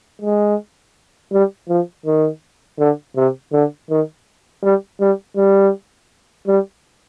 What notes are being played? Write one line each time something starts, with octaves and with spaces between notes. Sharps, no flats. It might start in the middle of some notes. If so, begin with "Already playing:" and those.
G#3
G3
F3
D#3
D3
C3
D3
D#3
G3
G3
G3
G3